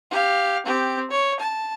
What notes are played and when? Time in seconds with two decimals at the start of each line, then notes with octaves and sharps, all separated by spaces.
0.11 G4 F5
0.66 C4 G4
1.11 C#5
1.40 A5